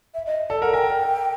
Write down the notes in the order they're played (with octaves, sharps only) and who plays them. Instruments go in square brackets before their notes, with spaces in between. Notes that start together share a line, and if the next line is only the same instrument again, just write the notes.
[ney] E5
D#5
[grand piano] A4 [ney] D5
[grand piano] A#4 [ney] F#5
[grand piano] A#4 [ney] G#5
[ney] G5